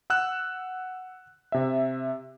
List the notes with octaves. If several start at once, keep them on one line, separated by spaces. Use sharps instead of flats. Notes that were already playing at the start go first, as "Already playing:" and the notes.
F#5 E6 F#6 E7
C3 E5